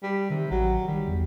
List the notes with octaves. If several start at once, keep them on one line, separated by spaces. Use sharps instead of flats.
G3
C3 D#3
A1 F#3
D#3 G3
E2